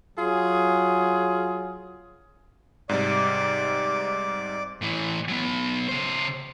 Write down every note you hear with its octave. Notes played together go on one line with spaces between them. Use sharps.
F#3 F4 G#4
G#2 C3 G3 D5 D6
A2 E3
F#3 B3
C#3 C5